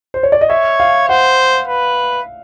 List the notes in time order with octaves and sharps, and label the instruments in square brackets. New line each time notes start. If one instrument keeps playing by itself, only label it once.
[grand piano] C5
C#5
D5
D#5
[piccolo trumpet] C#5 [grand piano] E5
[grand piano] F5
[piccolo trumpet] C5 [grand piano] F#5
[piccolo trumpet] B4